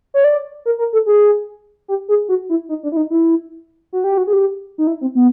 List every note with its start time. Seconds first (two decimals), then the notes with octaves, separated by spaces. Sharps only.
0.14 C#5
0.24 D5
0.65 A#4
0.79 A#4
0.93 A4
1.06 G#4
1.88 G4
2.08 G#4
2.29 F#4
2.49 E4
2.69 D#4
2.83 D4
2.92 E4
2.97 D#4
3.10 E4
3.93 F#4
4.04 G4
4.18 F#4
4.27 G#4
4.33 G4
4.78 D#4
4.87 E4
5.01 C4
5.15 B3